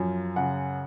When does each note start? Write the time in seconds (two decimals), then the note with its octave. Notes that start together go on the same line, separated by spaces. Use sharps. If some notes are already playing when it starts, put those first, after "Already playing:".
Already playing: F#2 F3
0.36 C#3 F#5